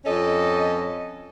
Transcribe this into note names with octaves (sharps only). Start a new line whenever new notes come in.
F2 C#4 A4 D#5